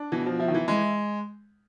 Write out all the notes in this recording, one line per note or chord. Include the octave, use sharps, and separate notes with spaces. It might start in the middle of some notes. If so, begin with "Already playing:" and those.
Already playing: D4
B2 E3
F3
F3 E4
D#3
E3
E3 G#3